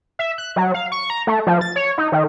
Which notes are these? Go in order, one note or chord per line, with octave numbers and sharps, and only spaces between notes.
E5
F#6
F#3
F5
C#6
A#5
A3
F3
A6
C#5
D#4
D#3